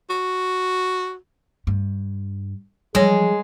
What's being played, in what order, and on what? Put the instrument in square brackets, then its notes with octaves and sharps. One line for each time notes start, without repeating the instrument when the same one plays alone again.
[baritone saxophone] F#4
[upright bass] G2
[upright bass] E3 F3 [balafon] G3 C#5 [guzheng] G#3 [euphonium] G#4